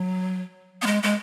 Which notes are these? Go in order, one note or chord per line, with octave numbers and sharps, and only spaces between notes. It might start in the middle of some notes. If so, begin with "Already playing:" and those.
Already playing: F#3
B3
G#3
G#3